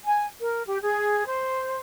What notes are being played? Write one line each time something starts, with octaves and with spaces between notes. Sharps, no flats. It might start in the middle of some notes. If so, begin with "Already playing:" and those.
G#5
A#4
G4
G#4
C5